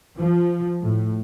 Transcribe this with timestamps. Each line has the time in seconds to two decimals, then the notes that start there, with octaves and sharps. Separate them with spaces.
0.17 F3
0.82 A2